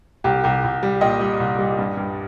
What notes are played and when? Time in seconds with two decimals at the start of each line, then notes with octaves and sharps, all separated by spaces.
0.24 C2 G4
0.44 C2 G4
0.64 C2
0.83 G3
1.01 A#2 D#5 G5
1.21 G3
1.40 C2
1.59 G3
1.79 G2
1.97 G2